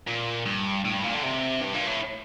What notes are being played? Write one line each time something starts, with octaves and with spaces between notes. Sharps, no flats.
A#2
G2
A2
G2
A#2
D3
C3
G2
A#2
A2